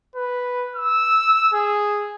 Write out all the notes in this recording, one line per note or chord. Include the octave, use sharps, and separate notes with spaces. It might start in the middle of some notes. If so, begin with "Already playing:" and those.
B4
E6
G#4